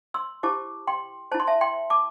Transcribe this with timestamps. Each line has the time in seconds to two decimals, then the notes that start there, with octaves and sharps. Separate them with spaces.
0.14 C6 E6
0.43 E4 G4 C5 A5 D6
0.87 G5 C6
1.32 E4 C5 A5
1.40 C6
1.47 E5 A5
1.61 G5 C6
1.90 A5 D6